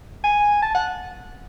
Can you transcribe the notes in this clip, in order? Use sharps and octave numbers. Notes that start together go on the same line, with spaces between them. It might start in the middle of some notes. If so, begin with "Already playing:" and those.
G#5
A5
F#5